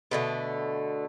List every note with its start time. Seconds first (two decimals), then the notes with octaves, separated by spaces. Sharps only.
0.11 B2 D3 A3